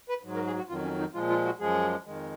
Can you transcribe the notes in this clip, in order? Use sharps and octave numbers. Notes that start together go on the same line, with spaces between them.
B4
G#2 F#3
A#4
G#4
F#4
F2 D#3 F#3 F4
C#4
D#4
A#2 F3 G#3 F4
F4
F#4
F#2 F3 G#3 G#4
F2 D#3 G#3